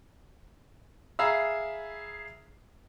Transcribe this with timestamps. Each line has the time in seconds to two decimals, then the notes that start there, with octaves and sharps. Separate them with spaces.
1.19 G#4 E5 F5 A#5 B5 E6